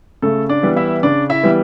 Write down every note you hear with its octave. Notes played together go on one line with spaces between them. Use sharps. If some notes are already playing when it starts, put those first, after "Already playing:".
C#3 A3 A4
D4 D5
E3 G3 B3
E4 E5
C#3 D4 D5
E4 E5
E3 G3 B3